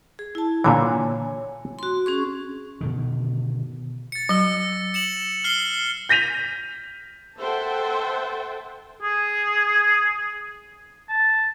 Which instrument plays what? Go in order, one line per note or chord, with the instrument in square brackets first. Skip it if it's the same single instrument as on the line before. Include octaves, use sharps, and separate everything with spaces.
[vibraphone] G#4
E4 A5
[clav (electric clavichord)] A#2 D3 E3 [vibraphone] C#5 G#5
[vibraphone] F#4 C6
C#4 G#4 C#6
[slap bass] B2 D3 D#3
[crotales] A6 C#7
[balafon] F#3 [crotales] E6 A#6
[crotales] C#7 E7 F#7
F6 C7 G7
[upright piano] G6 A#6 B6 D#7 F7
[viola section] A4 C5 E5 F#5 G5 A5
[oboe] G#4
A5